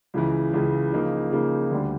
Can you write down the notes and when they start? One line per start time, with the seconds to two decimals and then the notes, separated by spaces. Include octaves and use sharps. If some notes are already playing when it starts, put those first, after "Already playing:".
0.14 C#2 C#3 E3
0.53 C#2 C#3 E3
0.92 C#3 F3 A#3 D#4
1.32 C#3 F3 A#3 D#4
1.71 D2 D3 G3